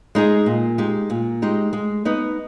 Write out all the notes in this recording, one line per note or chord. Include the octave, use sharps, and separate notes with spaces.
G#3 D#4 G#4
A#2
G#3 D#4 G4
A#2
G#3 D#4 G4
G#3
B3 D#4